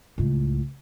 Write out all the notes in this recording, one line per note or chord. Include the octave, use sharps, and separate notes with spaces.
C#2 A2